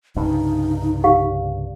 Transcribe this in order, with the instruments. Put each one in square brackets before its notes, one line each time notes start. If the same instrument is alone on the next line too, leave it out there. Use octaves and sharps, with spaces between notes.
[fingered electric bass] C2 G2 C#3 [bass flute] D#4
[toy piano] G4 F5